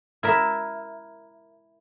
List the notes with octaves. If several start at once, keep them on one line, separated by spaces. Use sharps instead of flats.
E4 A#4 E5